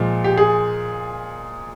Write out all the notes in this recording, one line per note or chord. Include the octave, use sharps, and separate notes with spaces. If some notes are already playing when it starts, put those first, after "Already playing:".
Already playing: A#2 F3 G#3
G4
G#4